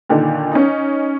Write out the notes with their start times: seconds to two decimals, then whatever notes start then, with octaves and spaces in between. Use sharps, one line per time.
0.10 A#2 D3 D#3
0.52 C#4 D#4